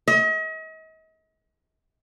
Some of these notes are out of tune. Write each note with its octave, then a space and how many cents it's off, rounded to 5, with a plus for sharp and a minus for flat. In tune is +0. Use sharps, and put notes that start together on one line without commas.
D#5 +40